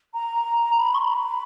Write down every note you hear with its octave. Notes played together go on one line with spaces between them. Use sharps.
A#5
B5
C#6
B5
A#5
B5